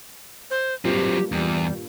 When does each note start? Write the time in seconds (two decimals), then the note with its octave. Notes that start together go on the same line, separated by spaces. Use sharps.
0.51 C5
0.85 G2 A#2 F#3 C4 G4
1.32 E2 G3